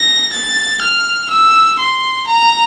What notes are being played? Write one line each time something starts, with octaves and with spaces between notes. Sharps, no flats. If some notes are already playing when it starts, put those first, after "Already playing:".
Already playing: A#6
A6
F6
E6
C6
A#5